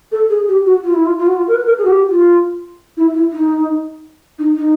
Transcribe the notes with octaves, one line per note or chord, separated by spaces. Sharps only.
A4
G#4
G4
F#4
F4
E4
F4
F4
F#4
F4
A#4
B4
A#4
G#4
F#4
G4
F4
E4
E4
D#4
D#4
D#4